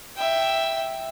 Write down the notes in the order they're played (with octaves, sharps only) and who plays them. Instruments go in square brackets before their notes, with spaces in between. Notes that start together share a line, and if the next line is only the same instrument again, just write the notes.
[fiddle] E5 G5